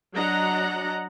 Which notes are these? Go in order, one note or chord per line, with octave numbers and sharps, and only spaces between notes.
F#3 D4 D#5 F#5 A#5